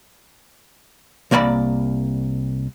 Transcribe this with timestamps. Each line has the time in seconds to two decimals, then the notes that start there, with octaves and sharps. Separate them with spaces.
1.31 C2 A#3 D5 G#5 B5